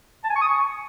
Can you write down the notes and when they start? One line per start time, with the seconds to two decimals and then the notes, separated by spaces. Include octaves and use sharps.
0.24 A5
0.30 G#5
0.36 C#6
0.41 D#6
0.47 C#6